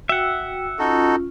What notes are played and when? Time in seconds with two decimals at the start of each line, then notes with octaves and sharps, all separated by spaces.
0.09 F#4 E5 F#5 G5 E6
0.79 C#4 D#4 F4 F#4 A4